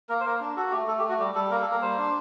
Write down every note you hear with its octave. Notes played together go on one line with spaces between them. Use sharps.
A#3 A#4
C5
A#3 A#4
D4
F#4 A4
A3 G4
A3 A4
G4
A3 F#4
G3 G4
G3 A4
A#3 A#4
A4
A#3
A#4
G3 C5
D4